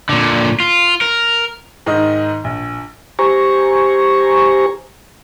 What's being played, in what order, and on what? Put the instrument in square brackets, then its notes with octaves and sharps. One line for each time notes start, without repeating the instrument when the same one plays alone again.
[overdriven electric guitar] A#2 D3
F4
A#4
[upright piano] G#2 D#3 D#5
A#1
[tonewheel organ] G4 C5 G#5 A#5 C#6